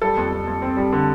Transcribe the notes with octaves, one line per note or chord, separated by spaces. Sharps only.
G3 A4
F2
F2
F2
C4
G3
D3